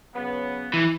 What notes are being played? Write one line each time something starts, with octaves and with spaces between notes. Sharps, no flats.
C#3 F#3 B3
E3